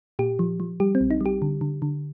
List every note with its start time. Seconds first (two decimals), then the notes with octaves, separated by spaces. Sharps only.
0.19 A#2 G4
0.39 F3
0.60 F3
0.80 G3 G4
0.95 C4
1.01 A#1
1.11 D#4
1.21 G3 G4
1.42 D3
1.61 D3
1.82 D3